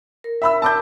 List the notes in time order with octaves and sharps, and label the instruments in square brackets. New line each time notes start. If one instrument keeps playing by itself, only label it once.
[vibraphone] A#4
[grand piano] E5 B5 E6
A5 D6 G6